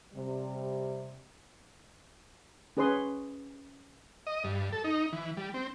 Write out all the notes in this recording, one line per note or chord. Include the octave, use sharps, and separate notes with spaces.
C3 G3
C#4 G#4 B4 C#5 C6 D#6
D#5
G2
A4
D#4
E3
G3
C4